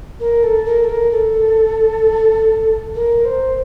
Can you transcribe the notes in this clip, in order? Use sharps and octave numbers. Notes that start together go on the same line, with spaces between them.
A#4
A4
A#4
A4
A#4
A4
A#4
C5